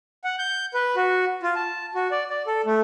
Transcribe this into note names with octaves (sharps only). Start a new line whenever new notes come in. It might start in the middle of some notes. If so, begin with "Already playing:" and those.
F#5
G6
B4
F#4
F4
A5
F#4
D5
D5
A4
A3